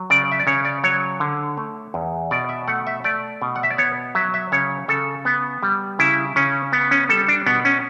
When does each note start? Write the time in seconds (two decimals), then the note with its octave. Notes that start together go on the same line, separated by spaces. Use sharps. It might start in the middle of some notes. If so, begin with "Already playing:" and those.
Already playing: F#3
0.10 C#3 D5
0.31 E5
0.40 D5
0.47 C#3 C#5
0.65 D5
0.84 F#3 C#5
1.20 D3
1.57 A3
1.94 E2
2.31 B2 D5
2.49 E5
2.68 A3 F#5
2.87 E5
3.04 A3 D5
3.42 B2
3.56 F#5
3.63 E5
3.70 D5
3.78 B3 C#5
4.15 F#3 E5
4.34 E5
4.52 C#3 C#5
4.88 C#3 A4
5.25 B3
5.63 G3
5.99 C#3 E4
6.36 C#3 C#4
6.73 B3
6.91 C#4
7.09 G3 A4
7.28 D4
7.47 B2 B3
7.65 C#4